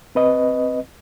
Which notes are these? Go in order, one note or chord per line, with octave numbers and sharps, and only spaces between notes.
C4 B4 D#5